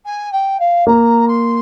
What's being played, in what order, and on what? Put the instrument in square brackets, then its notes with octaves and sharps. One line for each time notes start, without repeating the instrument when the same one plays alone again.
[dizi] G#5
G5
F5
[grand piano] A#3 [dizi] A#5
[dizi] C6